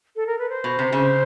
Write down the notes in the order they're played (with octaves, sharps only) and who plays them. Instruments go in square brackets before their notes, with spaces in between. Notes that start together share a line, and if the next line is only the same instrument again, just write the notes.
[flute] A4
A#4
B4
C5
[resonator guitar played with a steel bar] B2
C3
C#3